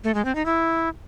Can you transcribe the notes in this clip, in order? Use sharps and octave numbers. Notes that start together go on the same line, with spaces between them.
A3
G#3
C4
D#4
E4